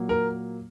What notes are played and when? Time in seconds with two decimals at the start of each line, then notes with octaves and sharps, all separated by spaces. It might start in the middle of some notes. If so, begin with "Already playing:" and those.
Already playing: A#2 F#3 A#3
0.09 A#4